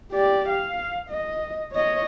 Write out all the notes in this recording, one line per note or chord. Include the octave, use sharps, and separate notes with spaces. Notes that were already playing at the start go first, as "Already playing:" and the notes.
G4 D5
F5
D#5
C#5 D#5